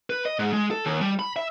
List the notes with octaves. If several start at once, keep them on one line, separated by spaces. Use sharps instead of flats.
B4
D#5
G#2
G#3
A4
D#2
G3
B5
E5